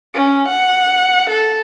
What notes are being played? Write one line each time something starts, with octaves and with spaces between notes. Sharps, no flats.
C#4
F#5
A4